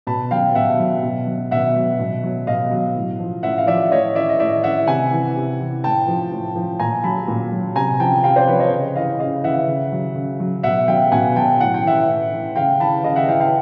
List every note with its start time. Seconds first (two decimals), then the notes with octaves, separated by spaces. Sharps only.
0.07 B2 A5 B5
0.31 F#3 F5 G5
0.55 B2 E5 F#5
0.79 F#3
1.03 B2
1.27 F#3
1.51 B2 E5 F#5
1.75 F#3
1.99 B2
2.24 F#3
2.47 B2 D#5 F5
2.71 F#3
2.96 A2
3.20 F3
3.43 A2 E5 F#5
3.58 F5
3.67 F3 D5 E5
3.91 A2 C#5 D#5
4.15 E3 D5 E5
4.29 D#5
4.39 A2 D5 E5
4.64 E3 E5 F#5
4.87 C3 F#5 G#5
5.12 E3
5.36 C3
5.60 E3
5.84 A2 G5 A5
6.07 F3
6.32 A2
6.56 F3
6.80 A#2 G#5 A#5
7.04 F#3 A5 B5
7.28 A#2
7.52 F#3
7.76 C3 G#5 A#5
8.00 F3 G5 A5
8.24 C3 F5 G5
8.36 C5 D5
8.47 F3 B4 C#5
8.60 C#5 D#5
8.72 C#3
8.96 E3 D#5 F5
9.19 C#3 D#5 F5
9.43 E3 E5 F#5
9.68 C#3
9.92 F#3
10.15 C#3
10.40 F#3
10.63 B2 E5 F#5
10.88 F#3 F5 G5
11.11 B2 F#5 G#5
11.36 F#3 G5 A5
11.60 A2 F#5
11.74 G5
11.84 E3 E5 F#5
12.08 A2
12.32 E3
12.56 C#3 F5 G5
12.80 E3 A5 B5
13.04 C#3 D#5 F5
13.16 E5 F#5
13.28 E3 F5 G5
13.40 F5 G5